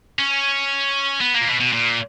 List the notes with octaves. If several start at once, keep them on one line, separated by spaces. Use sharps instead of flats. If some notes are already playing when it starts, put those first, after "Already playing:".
C#4
B3
A#3
A#2
B2
B2
A#2